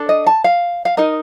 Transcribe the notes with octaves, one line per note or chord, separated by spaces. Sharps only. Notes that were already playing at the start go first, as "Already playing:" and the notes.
Already playing: D4 A4
D#5
A5
F5
F5
D#4 A#4 D#5